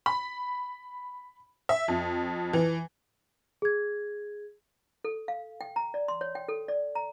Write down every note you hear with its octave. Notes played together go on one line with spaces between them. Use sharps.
B5
E5
F2
E3
G#4 G#6
A4
F5
G5
A#5
D5
C6
C#5
G5
A4
D5
A#5